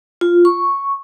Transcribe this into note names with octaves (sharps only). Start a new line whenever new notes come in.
F4
C#6